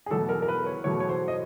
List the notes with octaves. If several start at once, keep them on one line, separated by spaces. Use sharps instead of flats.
G#4
E2 B2 F#3 A3 A4
A#4
A#4
B4
C#5
E2 B2 F#3 A3 C#5
C#5
C5
D#5